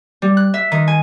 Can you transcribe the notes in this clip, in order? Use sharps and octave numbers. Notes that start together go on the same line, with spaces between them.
G3
F#6
E5
D#3
G#5